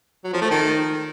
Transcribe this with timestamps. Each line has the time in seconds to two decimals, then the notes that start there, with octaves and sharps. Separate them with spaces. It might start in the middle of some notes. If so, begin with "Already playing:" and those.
0.24 F#3
0.33 F3
0.42 A3
0.50 D#3